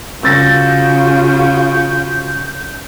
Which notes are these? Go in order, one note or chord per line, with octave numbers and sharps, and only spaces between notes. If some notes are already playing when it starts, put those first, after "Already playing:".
C#3 F4 F#4 E6 G6 A6 A#6